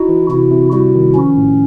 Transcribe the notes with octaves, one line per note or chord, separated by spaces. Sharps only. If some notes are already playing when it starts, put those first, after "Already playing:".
Already playing: D#4 E4 F#4
E3
C3 E4 F#4
C3
G3 E4 F#4
D#3
F3 C#4
A2